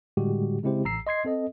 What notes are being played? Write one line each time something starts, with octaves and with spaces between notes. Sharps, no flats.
A2 D3 G3 G#3 F#4 G4
C#3 G#3 C4 E4 G4 C5
A1 A#5 E6 C7
D#5 C6 G#6 C7
C4 A4 D#5